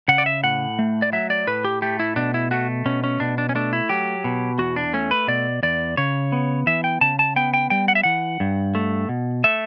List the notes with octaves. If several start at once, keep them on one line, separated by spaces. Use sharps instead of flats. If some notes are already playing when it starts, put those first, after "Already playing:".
C#3 F#5
D5
E5
A2 F#5
A3
D5
F#3 E5
D5
A2 B4
G4
A3 G4
E4
B2 D4
E4
A3 F#4
B2 C#4
C#4
B2 D4
D4
C#4
A3 D4
E4
F#3 G4
B2
E2 F#4
D4
A3 C#4
B4
B2 D5
E2 D5
C#3 C#5
B3
E3 E5
G5
C#3 A5
A5
B3 G5
G5
G3 G5
F#5
E5
E3 F#5
G2
A3
B2
A3 E5